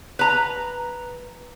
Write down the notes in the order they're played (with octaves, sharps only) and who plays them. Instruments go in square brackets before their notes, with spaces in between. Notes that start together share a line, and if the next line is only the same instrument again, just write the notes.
[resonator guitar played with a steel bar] B4 A#5